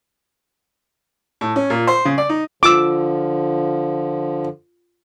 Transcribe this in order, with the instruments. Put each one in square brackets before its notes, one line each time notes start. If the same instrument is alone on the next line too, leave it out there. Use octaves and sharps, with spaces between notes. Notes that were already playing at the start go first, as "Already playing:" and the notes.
[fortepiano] A2
C#4
A#2
C5
C#3
D5
D#4
[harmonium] D3 F3 [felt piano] F4 [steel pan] D6 E6